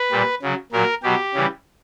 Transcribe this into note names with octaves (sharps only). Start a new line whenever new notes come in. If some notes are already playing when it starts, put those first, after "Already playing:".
Already playing: B4
A#2 G3
C#3 F#3
A#2 F#3 A#4
B2 F#3 G4
C#3 E3 G3